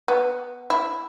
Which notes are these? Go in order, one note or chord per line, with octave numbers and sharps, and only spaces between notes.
B3
E4